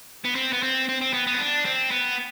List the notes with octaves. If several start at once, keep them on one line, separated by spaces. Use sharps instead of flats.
B3
C4
B3
C4
C4
C4
B3
B3
C4
D4
C4
B3